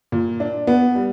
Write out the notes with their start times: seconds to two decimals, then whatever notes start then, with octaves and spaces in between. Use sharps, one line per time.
0.12 A#2
0.40 D4
0.67 B3
0.95 G3